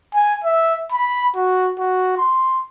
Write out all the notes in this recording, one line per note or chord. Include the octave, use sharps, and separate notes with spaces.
G#5
E5
B5
F#4
F#4
C6